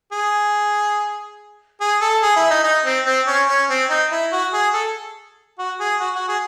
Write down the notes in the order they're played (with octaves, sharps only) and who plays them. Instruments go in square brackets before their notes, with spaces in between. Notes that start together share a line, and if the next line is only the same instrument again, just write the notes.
[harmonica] G#4
G#4
A4
G#4
E4
D#4
D#4
C4
C4
C#4
C#4
C4
D#4
E4
F#4
G#4
A4
F#4
G#4
F#4
F#4
G#4